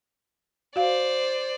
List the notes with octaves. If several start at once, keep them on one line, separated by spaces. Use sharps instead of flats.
F#4 C5 D5 F5